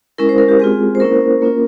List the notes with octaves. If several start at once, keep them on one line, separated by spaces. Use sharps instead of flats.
G#3 C#4 E4 A#4
C5
A#4
G4
G#3 C4 F4 G#4
C5
A#3 C#4 E4 A#4
A#3 C#4 F4